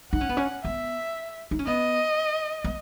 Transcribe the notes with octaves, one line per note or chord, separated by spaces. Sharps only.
D#4 F#5
C#4
B3
C#4
B3 E5
D#4
C#4
B3 D#5
B3